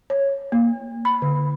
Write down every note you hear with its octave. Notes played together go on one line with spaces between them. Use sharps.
C#5
A#3
B5
D3